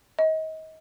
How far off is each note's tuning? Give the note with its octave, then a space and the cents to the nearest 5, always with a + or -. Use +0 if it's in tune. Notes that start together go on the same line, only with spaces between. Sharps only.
D#5 +30